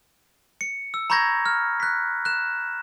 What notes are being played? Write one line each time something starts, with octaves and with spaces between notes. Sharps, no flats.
C#7
E6
A#5 B5 C#6 G6 G#6 A#6
F6
F#6 B6
F#6 E7